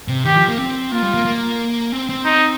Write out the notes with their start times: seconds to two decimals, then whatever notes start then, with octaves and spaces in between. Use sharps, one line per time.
0.08 C3
0.25 D#3 G4
0.36 F3
0.48 A#3
0.58 C4
0.92 A#3 F4
1.02 G3
1.14 A#3
1.25 A#3
1.92 C4
2.09 C4
2.25 D#4